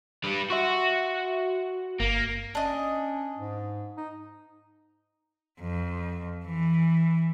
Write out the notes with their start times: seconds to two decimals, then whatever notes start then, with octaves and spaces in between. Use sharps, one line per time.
0.24 G3 B4
0.50 F#4 E5 C6 C#6
2.00 G1 A#3
2.55 C#4 D4 D#5
3.38 G#2
3.97 D#4
5.61 F2
6.45 E3